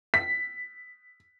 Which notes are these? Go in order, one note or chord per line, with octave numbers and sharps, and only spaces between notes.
B6